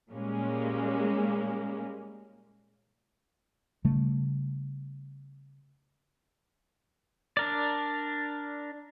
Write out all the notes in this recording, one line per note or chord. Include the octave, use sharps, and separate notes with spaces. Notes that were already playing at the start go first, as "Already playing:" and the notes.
A#2 G3 G#3 A#3 C#4
C#3 G3 A3
D4 A#4 D5